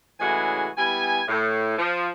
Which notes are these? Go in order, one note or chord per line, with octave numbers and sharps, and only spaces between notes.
A2 C#3 E3 G#3 F#4 G#5
G3 B3 E4 G#5
A2
F3